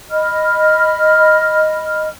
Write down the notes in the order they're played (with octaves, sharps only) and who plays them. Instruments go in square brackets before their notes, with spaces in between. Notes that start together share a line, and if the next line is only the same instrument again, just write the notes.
[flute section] D#5 B5 F6